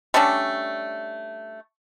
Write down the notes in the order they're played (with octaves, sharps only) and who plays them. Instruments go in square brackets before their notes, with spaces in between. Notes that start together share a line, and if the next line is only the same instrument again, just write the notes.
[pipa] G3 A3 C#4 D4